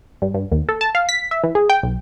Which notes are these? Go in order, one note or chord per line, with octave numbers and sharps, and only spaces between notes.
G2
G2
D#2
A4
A5
F5
B6
E5
E3
G#4
G5
B1